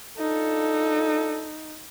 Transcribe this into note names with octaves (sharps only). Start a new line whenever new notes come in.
D4 D#4 F4 A4